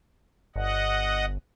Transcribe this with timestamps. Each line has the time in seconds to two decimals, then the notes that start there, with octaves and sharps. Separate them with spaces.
0.56 G1 D#5 F#5